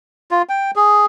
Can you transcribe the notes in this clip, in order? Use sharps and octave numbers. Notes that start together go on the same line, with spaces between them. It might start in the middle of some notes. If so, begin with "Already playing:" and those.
F4
G5
G#4